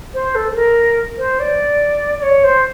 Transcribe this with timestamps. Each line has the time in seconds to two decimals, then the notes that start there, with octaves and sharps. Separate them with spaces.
0.14 C5
0.35 A4
0.52 A4
0.55 A#4
1.18 C5
1.39 D5
2.19 D5
2.22 C#5
2.43 C5